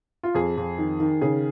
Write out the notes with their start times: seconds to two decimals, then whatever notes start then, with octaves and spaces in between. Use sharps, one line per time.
0.23 F4
0.34 F2 G#4
0.57 F2
0.78 D#3
1.00 D#3
1.21 C#3 G#4